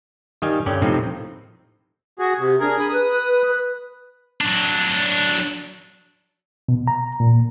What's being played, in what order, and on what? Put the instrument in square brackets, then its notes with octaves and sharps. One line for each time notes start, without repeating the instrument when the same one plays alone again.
[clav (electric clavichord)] D#3 G3 D#5 F5 G#5
G2 D3 C#4 D5 G5
A2 C3 F3 C4 D#4
[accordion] F#4 G#4
C3
[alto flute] D4 [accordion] G#4 A#4
[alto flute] G#4 [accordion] B5 D#6
[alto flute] B4
B4
[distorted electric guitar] F#3 D4
[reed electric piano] B2
A#5
A#2